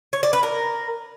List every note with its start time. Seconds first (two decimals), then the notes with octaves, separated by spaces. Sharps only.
0.13 C#5
0.23 D5
0.33 B4
0.43 A#4